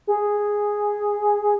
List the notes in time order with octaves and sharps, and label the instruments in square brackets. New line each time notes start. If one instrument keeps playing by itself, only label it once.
[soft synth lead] G#4